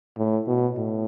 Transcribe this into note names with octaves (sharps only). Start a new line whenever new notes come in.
A2
B2
A2